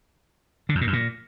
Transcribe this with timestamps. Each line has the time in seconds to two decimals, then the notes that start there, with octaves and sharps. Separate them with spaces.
0.69 D3
0.75 F2
0.81 A#2
0.87 F#2
0.93 A#2